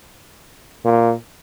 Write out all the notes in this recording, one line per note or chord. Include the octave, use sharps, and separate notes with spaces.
A#2